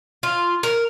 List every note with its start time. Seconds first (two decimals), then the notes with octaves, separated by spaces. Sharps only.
0.23 F4
0.63 A#4